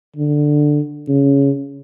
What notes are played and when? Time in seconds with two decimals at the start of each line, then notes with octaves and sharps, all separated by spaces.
0.16 D3
1.08 C#3